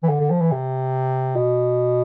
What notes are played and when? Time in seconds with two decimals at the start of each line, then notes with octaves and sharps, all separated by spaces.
0.03 E3
0.09 D3
0.20 D3
0.31 F3
0.41 E3
0.52 C3
1.36 B2